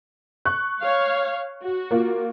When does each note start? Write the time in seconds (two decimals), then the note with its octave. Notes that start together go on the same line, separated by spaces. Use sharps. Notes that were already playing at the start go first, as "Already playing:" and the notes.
0.45 C#6 F#6
0.80 C#5 F5
1.62 F#4
1.91 A#3 F4